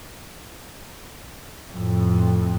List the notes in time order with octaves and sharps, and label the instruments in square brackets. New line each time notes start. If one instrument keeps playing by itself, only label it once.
[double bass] F2 A2